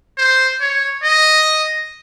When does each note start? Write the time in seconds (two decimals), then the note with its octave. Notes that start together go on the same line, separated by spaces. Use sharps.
0.18 C5
0.60 C#5
1.03 D#5